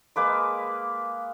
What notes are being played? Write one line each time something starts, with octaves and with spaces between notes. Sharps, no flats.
G#3 A#3 B4 D6